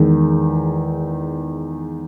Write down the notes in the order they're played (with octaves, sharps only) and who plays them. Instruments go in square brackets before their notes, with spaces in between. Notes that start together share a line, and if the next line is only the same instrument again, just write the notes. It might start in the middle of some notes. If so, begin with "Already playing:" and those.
Already playing: [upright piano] E2 D#3 G#3